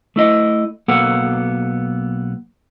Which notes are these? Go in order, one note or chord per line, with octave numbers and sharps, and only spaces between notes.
A3 E4 D#5
B1 A#3 B3 A4 F#5